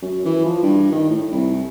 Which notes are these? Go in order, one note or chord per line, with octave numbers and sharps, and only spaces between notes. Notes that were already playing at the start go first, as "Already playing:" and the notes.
F#2
E3
F3
G2
D#3
A2
C2